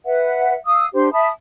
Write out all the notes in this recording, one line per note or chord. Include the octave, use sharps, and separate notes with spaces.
B4 E5 F#5
F5 D#6 E6
D4 G4 C5 C6
E5 A5 B5 D#6